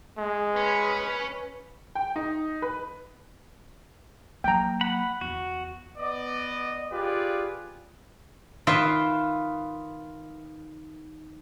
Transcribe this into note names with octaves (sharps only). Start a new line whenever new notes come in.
G#3
C#4 B4
G5
D#4
B4
F#3 A#3 G5 A#5
F#5 B5
E2 F#4
B3 D5 D#5
F4 G4 G#4 B4 D5
D#3 F4 B4 E5 C6